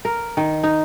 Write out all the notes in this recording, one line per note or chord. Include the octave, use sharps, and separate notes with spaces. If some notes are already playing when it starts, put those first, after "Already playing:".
A#4
D#3
D#4